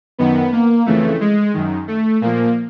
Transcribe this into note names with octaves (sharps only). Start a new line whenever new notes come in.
F#2 D#3 B3
A#3
F2 C#3 E3 A3
G#3
F#2 D#3
A3
A#2 F3 A#3